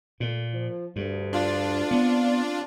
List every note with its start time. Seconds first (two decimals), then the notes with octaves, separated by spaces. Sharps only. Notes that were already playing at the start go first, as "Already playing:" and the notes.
0.20 A#2 A3
0.53 F3
0.96 D2 G2
1.33 D4 F4
1.91 B3 C4